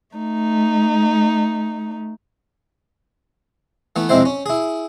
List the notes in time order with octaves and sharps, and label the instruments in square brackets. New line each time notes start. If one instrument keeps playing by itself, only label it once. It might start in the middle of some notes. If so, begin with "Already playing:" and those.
[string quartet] A3 D#4
[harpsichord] E3 A3 B3
F2 C3 G#3 C4 E4 C5
C#4
E4 G#4